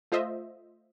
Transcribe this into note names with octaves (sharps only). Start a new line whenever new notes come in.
A3 F4 C5 D#5 E5